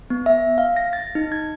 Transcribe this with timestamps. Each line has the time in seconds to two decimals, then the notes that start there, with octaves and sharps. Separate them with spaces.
0.10 B3
0.26 E5
0.58 F5
0.76 A#6
0.93 A6
1.15 D#4
1.32 G#6